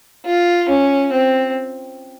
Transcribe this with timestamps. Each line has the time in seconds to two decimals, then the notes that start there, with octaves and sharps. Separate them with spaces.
0.25 F4
0.69 C#4
1.13 C4